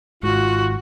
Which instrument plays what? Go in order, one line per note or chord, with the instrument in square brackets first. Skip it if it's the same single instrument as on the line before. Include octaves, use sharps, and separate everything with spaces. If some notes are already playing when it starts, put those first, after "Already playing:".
[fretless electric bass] G#1 G#2 [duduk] F4 [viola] F#4